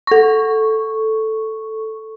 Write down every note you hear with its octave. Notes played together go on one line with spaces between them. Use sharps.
A4 C#6